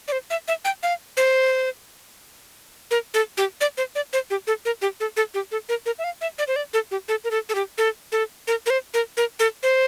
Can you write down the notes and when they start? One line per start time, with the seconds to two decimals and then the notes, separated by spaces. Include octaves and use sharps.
0.08 D5
0.12 C5
0.30 E5
0.48 E5
0.65 G5
0.83 F5
1.17 C5
2.91 A#4
3.14 A4
3.37 G4
3.61 D5
3.77 C5
3.95 D5
4.13 C5
4.30 G4
4.47 A4
4.65 A#4
4.82 G4
5.00 A4
5.17 A4
5.34 G4
5.52 A4
5.69 A#4
5.86 A#4
5.99 E5
6.04 F5
6.21 E5
6.39 D5
6.48 C5
6.56 D5
6.73 A4
6.91 G4
7.08 A4
7.24 A#4
7.31 A4
7.49 A4
7.55 G4
7.78 A4
8.12 A4
8.47 A#4
8.66 A#4
8.70 C5
8.94 A#4
9.17 A#4
9.40 A4
9.63 C5